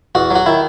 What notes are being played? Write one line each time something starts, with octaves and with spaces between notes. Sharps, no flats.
E2 F#4
F#3 F#4
D#3 E4